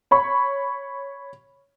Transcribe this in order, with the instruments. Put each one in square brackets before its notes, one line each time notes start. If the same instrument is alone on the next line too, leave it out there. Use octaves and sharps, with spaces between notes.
[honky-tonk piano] C#5 B5 C#6